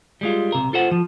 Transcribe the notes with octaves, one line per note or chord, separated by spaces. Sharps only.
G3 G#3 F4
B1 C3 A#4
F4 A4 C5 F#5
F3